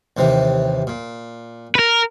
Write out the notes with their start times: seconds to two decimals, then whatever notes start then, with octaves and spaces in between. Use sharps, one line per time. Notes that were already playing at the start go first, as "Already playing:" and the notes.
0.17 D#2 C3 E3
0.87 A#2
1.75 A#4 B4